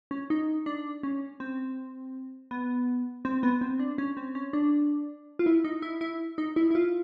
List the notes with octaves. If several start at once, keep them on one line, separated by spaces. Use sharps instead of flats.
C#4
D#4
D4
C#4
C4
B3
C4
B3
C4
D4
C#4
C4
C#4
D4
F4
E4
D#4
E4
E4
D#4
E4
E4
F4